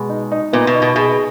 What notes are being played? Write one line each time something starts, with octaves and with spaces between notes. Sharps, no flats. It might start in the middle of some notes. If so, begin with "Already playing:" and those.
Already playing: B2 G#3
D#4
D#4
A#2 B3
B2
D#4
B2
B2 G#4